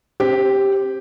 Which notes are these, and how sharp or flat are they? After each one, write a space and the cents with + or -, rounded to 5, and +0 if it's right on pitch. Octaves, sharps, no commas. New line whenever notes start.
C4 +35 G4 +0 C5 -10